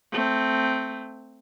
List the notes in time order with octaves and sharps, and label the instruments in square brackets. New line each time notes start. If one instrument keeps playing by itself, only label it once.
[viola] A3 C4